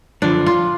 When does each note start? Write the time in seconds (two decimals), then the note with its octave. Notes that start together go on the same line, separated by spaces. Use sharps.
0.22 F#2 D3 F3 D4
0.46 F4